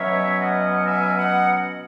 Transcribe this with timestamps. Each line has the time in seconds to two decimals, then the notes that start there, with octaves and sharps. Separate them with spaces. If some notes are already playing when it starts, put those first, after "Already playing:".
Already playing: B2 F#3 C#4 C#5 E5
0.38 D#5 F#5
0.86 E5 G#5
1.16 D#5 F#5